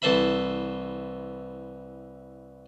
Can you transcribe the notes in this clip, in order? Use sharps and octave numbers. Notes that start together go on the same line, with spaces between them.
C2 E3 A4 C5 E5 B5